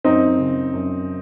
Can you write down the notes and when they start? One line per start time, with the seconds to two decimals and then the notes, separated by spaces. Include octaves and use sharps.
0.05 F#2 C4 D#4
0.39 C#3
0.74 F#2